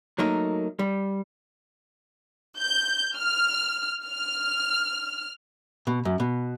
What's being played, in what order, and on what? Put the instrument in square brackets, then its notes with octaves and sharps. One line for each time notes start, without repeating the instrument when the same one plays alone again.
[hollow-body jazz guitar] F#3 A3 A#3 D#4 A#4
G3
[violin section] G6
F6
F6
[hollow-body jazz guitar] B2
F#2
B2